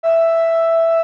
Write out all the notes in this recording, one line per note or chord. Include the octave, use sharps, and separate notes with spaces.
E5